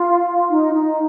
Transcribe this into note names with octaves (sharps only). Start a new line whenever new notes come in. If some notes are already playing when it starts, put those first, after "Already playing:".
Already playing: F4
D#4
D#4